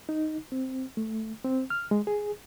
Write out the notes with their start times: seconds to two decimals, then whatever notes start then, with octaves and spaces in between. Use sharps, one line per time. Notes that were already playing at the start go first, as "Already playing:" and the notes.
0.09 D#4
0.52 C4
0.97 A3
1.45 C4
1.70 F6
1.91 G#3
2.07 G#4